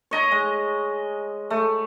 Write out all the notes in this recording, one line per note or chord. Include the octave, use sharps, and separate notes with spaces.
C#5 D#5 A#5
G#3
A3